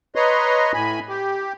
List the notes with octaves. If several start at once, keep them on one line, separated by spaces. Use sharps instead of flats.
B4 C#5 D#5 A#5 C6
A2 G#5 B5
G4